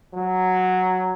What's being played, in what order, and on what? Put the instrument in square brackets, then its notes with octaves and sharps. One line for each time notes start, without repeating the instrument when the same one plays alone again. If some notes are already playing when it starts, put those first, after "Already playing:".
[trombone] F#3